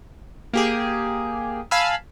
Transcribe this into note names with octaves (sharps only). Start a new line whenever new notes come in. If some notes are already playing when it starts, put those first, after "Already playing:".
A#3 G4 G#4
F5 G#5 A5 B5 E6